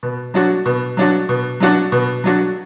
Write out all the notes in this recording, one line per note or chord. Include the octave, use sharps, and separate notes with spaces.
B2
F#3 D4 F#4
B2
F#3 D4 F#4
B2
F#3 D4 F#4
B2
F#3 D4 F#4